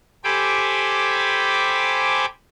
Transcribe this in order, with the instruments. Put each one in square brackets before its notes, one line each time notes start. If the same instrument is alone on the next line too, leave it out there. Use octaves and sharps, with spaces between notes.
[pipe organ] G4 A4 C5 G#5 B5 D6